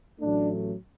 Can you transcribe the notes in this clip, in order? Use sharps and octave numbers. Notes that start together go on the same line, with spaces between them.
A1 A2 F#3 A3 D4